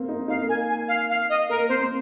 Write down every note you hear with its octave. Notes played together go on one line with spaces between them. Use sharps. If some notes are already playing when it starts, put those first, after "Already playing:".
Already playing: A#3 C4
D#4
D#4 F5
A#3
G#5
G#5
F5
F5
D#5
A#3 A#4
C4 C5
C4